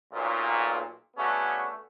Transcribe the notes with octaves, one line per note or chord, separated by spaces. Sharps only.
B1 A#2
C#3 A3 B3 C#4 D4 F#4